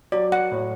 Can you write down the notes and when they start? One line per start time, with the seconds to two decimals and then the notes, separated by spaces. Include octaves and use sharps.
0.12 F#3 D5
0.32 F#5
0.52 A2